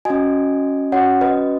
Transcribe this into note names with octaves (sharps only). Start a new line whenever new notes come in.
C#4 F#4 D#5 G#5
C#4 F#4 C#5 F#5
B4 D#5